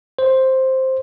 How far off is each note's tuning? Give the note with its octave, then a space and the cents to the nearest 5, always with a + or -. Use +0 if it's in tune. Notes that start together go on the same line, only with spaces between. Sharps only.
C5 +5